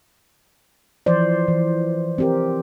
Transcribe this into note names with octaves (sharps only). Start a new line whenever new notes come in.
E3 F3 C5 D5
E3
C4 G4 A#4